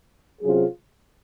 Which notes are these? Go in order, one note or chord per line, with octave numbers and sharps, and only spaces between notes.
C3 F#3 C#4 F4 G#4